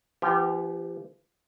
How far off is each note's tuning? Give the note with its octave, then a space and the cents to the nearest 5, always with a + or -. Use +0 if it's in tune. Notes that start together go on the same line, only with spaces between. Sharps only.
F3 -40 B3 +0 G4 +10